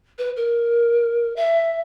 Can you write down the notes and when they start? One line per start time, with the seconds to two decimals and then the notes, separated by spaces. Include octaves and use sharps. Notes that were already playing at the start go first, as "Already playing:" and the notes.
0.18 B4
0.36 A#4
1.36 E5